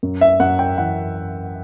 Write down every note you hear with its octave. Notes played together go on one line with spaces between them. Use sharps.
F#2
E5
F#2 F#5
G5
E3 F#5